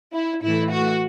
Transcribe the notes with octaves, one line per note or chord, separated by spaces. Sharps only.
E4
A2 E3 A3 E4
F#4